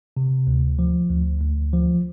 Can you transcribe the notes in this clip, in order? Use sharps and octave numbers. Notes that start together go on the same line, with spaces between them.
C3
D2
F3
D2
D2
F3